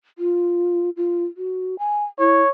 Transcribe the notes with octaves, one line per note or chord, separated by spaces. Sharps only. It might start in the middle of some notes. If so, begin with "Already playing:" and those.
F4
F4
F#4
G#5
E4 C#5